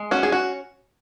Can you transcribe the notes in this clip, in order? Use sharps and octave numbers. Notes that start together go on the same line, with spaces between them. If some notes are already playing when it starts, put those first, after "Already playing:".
Already playing: G#3
C#4 F#4
G#4
F#4